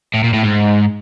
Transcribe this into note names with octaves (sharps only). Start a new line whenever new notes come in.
A2
A#2
A2
G#2